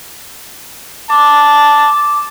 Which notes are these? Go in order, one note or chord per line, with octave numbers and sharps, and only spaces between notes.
A5 D6